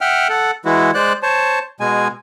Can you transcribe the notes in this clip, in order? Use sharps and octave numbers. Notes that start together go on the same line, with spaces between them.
E5 F#5 G5 F6
A4 F#5
E3 G#3 E4 F#4
G#3 C5 D5 F#6
C5 C#5 A5
B2 G#3 G#5